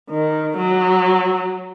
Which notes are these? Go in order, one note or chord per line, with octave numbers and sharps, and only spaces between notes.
D#3
F#3